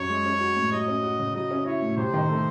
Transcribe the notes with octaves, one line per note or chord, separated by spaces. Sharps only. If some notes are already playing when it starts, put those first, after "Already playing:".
Already playing: F#2 C#5
G#3
C#4
F#4
A2
F#3 D#5
C#4
F#4
C#3
F#3 D#5
C#4
E4 C#5
A2
C3 C5
D#3
A3